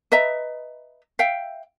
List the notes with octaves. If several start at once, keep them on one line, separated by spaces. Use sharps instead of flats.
B4 D#5 E5 A#5
E5 F5 G5